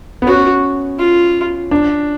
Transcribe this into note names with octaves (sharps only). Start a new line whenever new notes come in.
B3
C#4 F#4
F4
D4